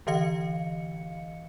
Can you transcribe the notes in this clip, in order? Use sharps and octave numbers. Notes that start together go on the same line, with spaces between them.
D3 E3 D#5 F5 C#7